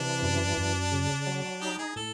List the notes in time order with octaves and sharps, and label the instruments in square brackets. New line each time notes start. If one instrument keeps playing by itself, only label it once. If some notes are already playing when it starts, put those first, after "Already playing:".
Already playing: [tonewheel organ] C3 E3 [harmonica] D4
[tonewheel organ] F#2
F#2
C#3
F#3
[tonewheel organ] D#4 [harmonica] G4
[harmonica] G#4
[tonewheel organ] A2 [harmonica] A4